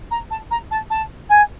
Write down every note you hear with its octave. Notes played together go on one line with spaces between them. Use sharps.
A#5
A5
A#5
A5
A5
G#5